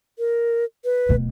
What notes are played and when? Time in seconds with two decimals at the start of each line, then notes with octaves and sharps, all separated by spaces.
0.19 A#4
0.84 B4
1.09 D1 B2